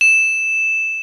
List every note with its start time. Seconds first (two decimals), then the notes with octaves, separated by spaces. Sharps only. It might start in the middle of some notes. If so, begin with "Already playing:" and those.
0.01 E7